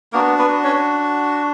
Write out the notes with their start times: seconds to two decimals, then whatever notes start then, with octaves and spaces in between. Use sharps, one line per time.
0.13 A#3 B3 D4 F#4 A#4
0.39 B3 B4
0.64 C#4 C#5